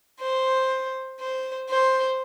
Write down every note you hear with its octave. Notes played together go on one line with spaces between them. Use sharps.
C5
C5
C5